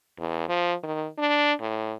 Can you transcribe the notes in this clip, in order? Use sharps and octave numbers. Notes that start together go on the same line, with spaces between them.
E2
F3
D#3
D4
A2